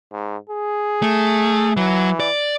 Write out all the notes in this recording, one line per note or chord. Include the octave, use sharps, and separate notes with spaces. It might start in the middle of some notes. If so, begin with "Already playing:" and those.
G#2
G#4
A3
E3 F#3
D5